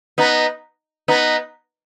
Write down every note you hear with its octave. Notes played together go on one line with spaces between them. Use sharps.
B3 D#4
B3 D#4